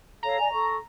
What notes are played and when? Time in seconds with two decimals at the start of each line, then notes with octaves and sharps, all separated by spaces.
0.23 A4 C#5 F5 A#5
0.38 D5 D#5 G#5
0.51 A4 C#6